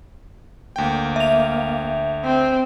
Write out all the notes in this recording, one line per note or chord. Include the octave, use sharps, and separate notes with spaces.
D2 A#3 G5
E5 F7
C4